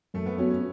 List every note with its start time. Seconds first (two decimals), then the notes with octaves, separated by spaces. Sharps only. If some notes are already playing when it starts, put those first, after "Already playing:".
0.14 F#2 A3
0.26 B3
0.38 F#3 B3 C#4 F#4
0.51 C#4